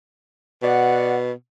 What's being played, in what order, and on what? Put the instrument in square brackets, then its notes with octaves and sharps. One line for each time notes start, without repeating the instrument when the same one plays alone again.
[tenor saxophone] B2 [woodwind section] D5 F#5